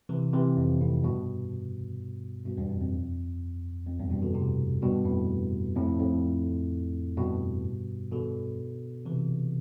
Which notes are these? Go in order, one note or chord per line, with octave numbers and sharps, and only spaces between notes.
C3 E3
C3 E3
F2
F2 A2
G2 B2
G2 B2
E2 G2
F2
F2
F2
E2 G2
G2 B2
B2 D3
A2 C3
G2 B2
F2 A2
F2 A2
F2 A2
G2 B2
B2 D3
C3 E3